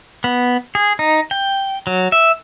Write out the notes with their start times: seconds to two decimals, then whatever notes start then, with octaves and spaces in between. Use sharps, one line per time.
0.24 B3
0.75 G#4
0.99 D#4
1.31 G5
1.87 F#3
2.12 E5